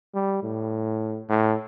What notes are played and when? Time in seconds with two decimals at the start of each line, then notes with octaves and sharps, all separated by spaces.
0.15 G3
0.43 A2
1.29 A2